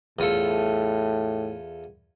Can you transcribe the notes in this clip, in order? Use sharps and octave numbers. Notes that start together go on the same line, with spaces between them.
E2 A2 F4 A4